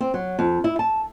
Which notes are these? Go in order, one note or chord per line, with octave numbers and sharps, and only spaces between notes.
C4
F#3
F2
E4
A5